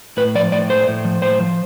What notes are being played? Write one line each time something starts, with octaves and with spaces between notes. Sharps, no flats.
A2 B4
F3 D5
A2 D5
A3 C5
A2
F3
A2 C5
F3